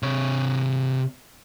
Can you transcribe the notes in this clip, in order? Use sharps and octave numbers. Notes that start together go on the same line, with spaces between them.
C3 C#5